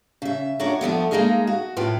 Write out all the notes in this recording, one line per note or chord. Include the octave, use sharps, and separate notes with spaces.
C#3 E5
D4 F4 F#4 A#4 C#5 D#5
F2 F3 A3 B3
G#3 A#3 C4 D#4 G#4 F5
F#4
F#2 A2 F4 B4 G5